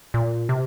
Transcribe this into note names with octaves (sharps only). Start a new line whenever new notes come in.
A#2
C3